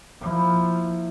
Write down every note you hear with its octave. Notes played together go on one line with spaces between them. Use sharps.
F3 A#3 E4